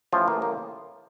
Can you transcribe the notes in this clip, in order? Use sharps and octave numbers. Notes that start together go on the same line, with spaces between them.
A1 A2 E3 F3 F4
A#3
A#3